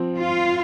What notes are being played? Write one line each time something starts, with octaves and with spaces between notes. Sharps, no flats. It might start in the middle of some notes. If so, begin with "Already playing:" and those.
Already playing: F3 C4
F4